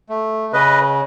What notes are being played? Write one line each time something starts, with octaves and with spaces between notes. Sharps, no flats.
A3
C#3 B4 D#5